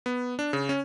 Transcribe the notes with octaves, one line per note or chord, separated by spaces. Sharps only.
B3
D4
C#3
C#4